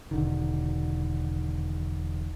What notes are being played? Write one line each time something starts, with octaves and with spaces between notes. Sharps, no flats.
E1 D3 D#3